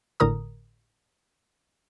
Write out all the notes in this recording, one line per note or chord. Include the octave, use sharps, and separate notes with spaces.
G#1 A2 D3 A#4 A#5 D#6